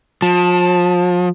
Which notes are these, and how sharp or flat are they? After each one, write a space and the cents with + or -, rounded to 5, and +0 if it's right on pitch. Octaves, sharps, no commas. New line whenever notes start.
F3 +35 A5 +0